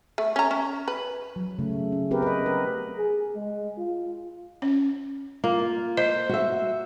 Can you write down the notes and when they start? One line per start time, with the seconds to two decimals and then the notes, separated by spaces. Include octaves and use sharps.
0.18 A3
0.36 C#4 A#5
0.51 C#4
0.88 B4
1.36 F#3
1.59 C#3 A3
1.92 C#4
2.11 B3 C4 G4 G#4 A#4 B4
2.22 B4 D#5
2.46 A#4
2.97 G#4
3.35 G#3
3.78 F4
4.62 C#4
5.44 A#3 F4
5.97 C5 D#5
6.29 F#4 E5